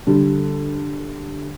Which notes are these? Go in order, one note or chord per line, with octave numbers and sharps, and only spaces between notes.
D3 G3